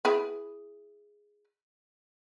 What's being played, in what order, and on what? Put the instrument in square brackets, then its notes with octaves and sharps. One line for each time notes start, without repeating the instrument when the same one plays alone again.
[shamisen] E4 G#4 B4